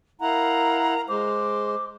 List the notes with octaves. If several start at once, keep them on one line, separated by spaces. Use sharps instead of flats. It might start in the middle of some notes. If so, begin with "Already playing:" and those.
E4 A#4 F5 F#5 A#5
G#3 C5 D6